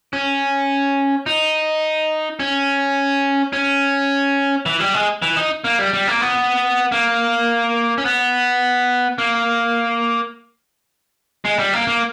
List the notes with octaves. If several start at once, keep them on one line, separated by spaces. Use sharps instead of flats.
C#4
D#4
C#4
C#4
E3
G3
G#3
E3
D#4
A#3
G3
G3
A#3
B3
A#3
C#4
B3
A#3
G#3
G3
A#3
A#3